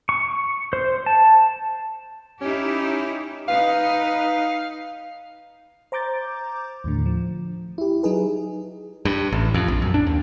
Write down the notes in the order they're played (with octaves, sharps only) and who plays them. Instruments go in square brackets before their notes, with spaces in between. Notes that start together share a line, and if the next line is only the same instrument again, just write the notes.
[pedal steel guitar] C#6
C5
A5
[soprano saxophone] C#4 [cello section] D#4 E4 G4
[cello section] D#4 B4 [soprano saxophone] F5
[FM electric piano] C5 A#5 D6 G6 A6
D#2 A2 D3
F3
E4 G4
F#3 D#4 G#4 B4
[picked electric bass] G2
A1
F2
A#1
F#2
D4
D#2